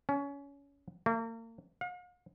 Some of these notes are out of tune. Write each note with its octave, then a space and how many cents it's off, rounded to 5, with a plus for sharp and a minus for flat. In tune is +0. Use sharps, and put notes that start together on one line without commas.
C#4 +25
A#3 -40
F5 +45